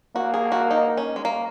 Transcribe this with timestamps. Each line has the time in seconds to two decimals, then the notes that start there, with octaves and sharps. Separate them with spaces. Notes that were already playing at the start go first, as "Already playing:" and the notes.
0.15 A#3 F#4
0.34 G#4
0.52 F#4
0.71 D#4
0.97 C#4
1.16 G#3
1.25 A#3